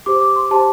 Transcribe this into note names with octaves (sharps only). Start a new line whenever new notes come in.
G4 C5 D6
D6
C6
G4 C5 A5